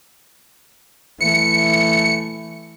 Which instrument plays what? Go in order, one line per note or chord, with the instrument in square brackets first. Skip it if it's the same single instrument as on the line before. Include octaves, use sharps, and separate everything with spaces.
[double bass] E3 A3 [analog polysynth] C#7